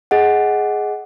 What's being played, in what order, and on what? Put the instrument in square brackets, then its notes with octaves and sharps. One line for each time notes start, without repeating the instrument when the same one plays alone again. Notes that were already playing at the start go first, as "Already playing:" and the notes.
[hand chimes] G#4 D#5 F#5